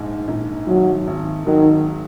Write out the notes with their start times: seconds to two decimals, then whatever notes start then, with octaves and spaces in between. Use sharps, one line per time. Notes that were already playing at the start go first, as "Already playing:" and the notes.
Already playing: A#1 G#2
0.28 A#1
0.67 G#1 F#3
1.07 G#1
1.46 D#3 F#3